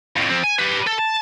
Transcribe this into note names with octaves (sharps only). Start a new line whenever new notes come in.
F2 A2
F3 C4
G#5
G4 B4
A4
A5